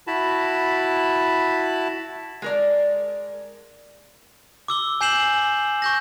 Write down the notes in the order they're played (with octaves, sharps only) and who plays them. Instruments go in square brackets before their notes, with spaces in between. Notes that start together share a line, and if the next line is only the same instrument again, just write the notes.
[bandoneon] E4 F#4 A5 B5
[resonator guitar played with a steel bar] G#3 A#4 D5
[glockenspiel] D6 E6 G7
G#5 G6 C7 E7 F#7
C#6 G6 A#6